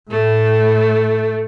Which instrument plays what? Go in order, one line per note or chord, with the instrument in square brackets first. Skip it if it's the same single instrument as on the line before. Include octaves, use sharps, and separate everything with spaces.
[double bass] A2 [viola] A3